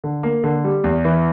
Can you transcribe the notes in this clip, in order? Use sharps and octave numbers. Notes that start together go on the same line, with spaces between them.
D3
A#3
D3
G3
E2
E3